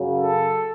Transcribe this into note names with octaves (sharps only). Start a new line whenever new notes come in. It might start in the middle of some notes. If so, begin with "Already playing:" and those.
Already playing: F#2 C#3 F#3
A4